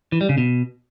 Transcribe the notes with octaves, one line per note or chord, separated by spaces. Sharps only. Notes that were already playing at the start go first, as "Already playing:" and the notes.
E3
G3
C#3
B2